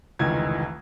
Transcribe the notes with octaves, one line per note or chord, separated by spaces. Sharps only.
F1 C#2 D#3 E3 G#6